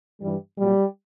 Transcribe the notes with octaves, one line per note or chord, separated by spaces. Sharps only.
G2 E3 G3
A#2 F#3 G3